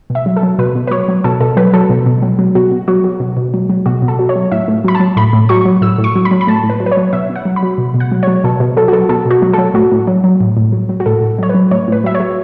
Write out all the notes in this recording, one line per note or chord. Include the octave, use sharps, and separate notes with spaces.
B2
E5
F#3
A4
F#3
B2 B4
B2
B4
F#3 C#5
F#3
B2 A4
B2 A4
F#3 B4
F#3 A4
B2
B2
F#3
F#3
B2 F#4
B2
F#3 F#4
F#3
B2
B2
F#3
F#3
B2 F#4
B2
A4
F#3
C#5
F#3
A2 E5
A2
F#3 B5
A5
F#3
A2 B5
A2
F#3 C#6
F#3
A2 E6
A2
C#6
F#3
B5
F#3
B5
A2 A5
A2
B4
F#3
B4
C#5
F#3
B2 E5
B2
F#5
F#3
B5
F#3
B2
B2
F#5
F#3
F#3 C#5
B2 A4
B2
F#3 A4
F#4
F#3 A4
B2 A4
B2
F#4
F#3
F#3 A4
A2 F#4
A2
F#3
F#3
A2
A2
F#3
F#3
F#4
A2 A4
A2
F#3 C#5
B4
F#3
A2 C#5
A2 B4
F#3 E5
C#5
F#3